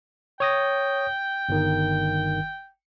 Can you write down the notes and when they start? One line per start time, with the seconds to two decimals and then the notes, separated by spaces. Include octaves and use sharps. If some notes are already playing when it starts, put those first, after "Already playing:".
0.40 C#5 G5 D#6 A#6
1.49 G1 D#3